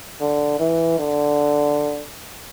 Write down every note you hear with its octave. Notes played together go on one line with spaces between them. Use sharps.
D3
E3
D3